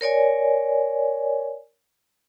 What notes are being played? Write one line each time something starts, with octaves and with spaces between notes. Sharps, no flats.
A#4 C#5 D5 G#5